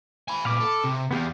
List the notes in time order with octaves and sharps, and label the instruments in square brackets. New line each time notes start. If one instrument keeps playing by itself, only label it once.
[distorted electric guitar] G#5 B5
[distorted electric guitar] A#2 B3 [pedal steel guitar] F5 B5 D6
[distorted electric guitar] A4
C3
[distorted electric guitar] E2 [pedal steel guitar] B3 G4 F5